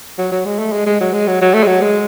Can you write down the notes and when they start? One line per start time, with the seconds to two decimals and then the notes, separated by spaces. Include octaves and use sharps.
0.19 F#3
0.32 F#3
0.46 G#3
0.59 A3
0.72 G#3
0.86 G#3
1.01 F#3
1.13 G#3
1.27 F#3
1.41 F#3
1.54 A3
1.63 G#3
1.67 F#3
1.81 G#3